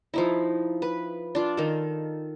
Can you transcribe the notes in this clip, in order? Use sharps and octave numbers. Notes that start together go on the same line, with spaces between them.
F3 D#4 E4
B4
D4 F4
D#3 A4